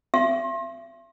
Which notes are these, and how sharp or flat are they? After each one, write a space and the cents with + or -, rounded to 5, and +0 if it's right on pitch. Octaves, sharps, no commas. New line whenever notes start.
E5 +40 C6 +35